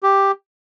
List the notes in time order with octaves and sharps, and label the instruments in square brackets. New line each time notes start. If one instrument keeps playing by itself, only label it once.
[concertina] G4